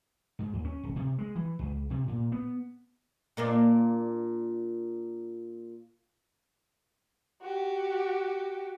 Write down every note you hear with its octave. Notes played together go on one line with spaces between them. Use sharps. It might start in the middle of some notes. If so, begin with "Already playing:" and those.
G#2
D#2
C#4
D1
C3
G#3
E3
C#2
C3
A#2
B3
A#2 A#3 D4
F#4 G4